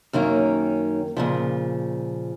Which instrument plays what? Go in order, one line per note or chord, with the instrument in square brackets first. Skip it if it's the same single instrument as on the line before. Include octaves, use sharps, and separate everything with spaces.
[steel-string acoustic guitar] F#2 D#3 A#3 C#4
A#2 C#3 F3